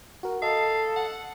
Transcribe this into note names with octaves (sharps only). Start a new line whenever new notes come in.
F#4 A#4
A4 D#5 F5
F#5